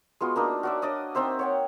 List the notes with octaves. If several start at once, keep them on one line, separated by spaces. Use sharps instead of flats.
G#3 B3 F4 F#4
A#3 D4 D#4
F#4 D5 E5
D4 D5 D#5 D#6
C4 D#4 C5 E5
C#5 F#5 G5